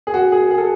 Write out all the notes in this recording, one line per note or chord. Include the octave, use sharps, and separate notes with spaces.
G#4
F#4
G#4
G#4
A4